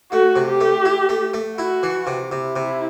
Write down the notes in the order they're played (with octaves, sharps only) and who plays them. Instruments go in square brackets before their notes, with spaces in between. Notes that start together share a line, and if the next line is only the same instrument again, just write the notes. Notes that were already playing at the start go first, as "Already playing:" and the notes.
[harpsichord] A3 [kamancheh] F#4
[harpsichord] C3
[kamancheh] G4
[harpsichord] A3
E4
A3
A3
[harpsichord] E4 [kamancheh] F#4
[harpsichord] E3
C3
[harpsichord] C3 [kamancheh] E4
[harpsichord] C3